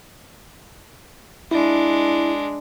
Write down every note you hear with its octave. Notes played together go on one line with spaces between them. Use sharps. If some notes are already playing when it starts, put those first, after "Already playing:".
G#3 D4 E4